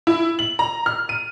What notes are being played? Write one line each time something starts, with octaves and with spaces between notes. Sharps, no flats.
E4
F#7
A#5
F6
D#7